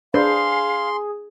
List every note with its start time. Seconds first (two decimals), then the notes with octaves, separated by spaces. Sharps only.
0.14 D4 G#4 B4 C5 F5 C6